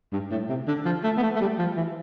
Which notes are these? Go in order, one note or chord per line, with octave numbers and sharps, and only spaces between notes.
G2
A2
C3
D3
F3
A3
B3
A3
A3
G3
F3
E3